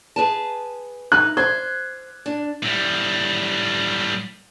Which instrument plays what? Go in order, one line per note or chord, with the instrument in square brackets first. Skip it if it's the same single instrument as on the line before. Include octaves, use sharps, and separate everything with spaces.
[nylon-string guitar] G#4 B4 A5
[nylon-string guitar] D#4 [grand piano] F#6
[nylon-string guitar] C5 [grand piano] G#6
[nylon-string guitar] D4
[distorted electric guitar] A2 G3